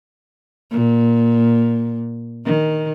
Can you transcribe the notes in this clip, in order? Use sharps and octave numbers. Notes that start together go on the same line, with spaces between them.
A#2
D#3